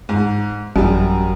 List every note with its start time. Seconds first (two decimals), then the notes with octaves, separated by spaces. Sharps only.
0.09 G#2
0.76 A1 F#2 G3